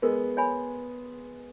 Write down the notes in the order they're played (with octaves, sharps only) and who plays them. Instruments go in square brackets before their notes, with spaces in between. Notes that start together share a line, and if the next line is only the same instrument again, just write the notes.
[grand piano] G#3 B3 [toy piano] A#4
[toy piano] C#5 G#5 B5